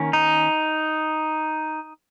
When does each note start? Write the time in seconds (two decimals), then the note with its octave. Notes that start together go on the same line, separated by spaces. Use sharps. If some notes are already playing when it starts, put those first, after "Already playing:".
Already playing: D#3 A#3 C#4
0.13 D#4